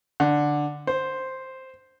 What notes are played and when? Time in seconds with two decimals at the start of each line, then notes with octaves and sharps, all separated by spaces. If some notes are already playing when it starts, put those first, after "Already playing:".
0.20 D3
0.87 C5